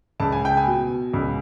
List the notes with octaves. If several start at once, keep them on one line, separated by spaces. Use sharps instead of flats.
C#2 A5
G#5
G5
G#5
B2
C#2